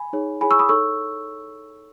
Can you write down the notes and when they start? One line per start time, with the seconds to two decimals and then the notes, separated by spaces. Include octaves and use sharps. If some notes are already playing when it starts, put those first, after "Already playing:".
Already playing: G#5 B5
0.13 D#4 G#4 C#5
0.41 E4 G#4 C#5 G#5 B5
0.51 C#6 E6
0.59 B5 D#6
0.69 D#4 A4 C#5 C#6 E6